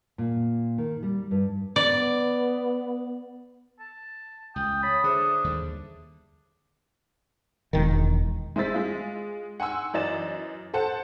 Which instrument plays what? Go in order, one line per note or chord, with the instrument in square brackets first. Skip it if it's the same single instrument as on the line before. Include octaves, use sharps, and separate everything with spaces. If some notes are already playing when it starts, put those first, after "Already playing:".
[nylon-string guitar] A#2
D#3
G3
G2
[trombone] B3 [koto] D5
[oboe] A5
[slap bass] C#2 [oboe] G5 [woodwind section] D#6
[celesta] C#5 A6 [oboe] B5
[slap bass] D3 [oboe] D4 [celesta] G#4 C5 E5
[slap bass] D#2 D3 G3
[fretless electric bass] E1 D#3
[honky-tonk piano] G#3 E4 C5 E6 A6 B6
G#3 F4
F#5 G#5 C6 E6
F#2 E3 D5 D#5 A6 E7
A4 C5 F#5 A5